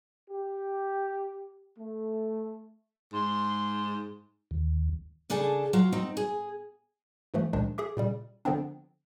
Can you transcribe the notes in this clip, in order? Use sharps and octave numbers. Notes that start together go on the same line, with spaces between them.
G4
A3
G#2 C6
D#2
C#3 D4 G#4 A4 G#5 A5
F#3 F4
C4 D#4
G#4
G#2 E3 F3 A3
C#2 A#2 D#3 F3 G#3 D4
G#4 A4 E5 D6
A#2 C#3 G3
D3 F3 B3 C4 D4